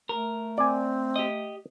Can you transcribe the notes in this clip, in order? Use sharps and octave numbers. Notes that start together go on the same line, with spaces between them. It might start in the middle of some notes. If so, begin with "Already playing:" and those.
A3 A#4
C4 D5 G#5
G4 D#5